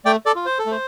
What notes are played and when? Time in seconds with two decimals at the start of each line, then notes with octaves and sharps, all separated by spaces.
0.05 A3 D5 G5
0.26 A4 D5
0.36 F4
0.46 C5
0.59 A4
0.66 A3
0.71 C5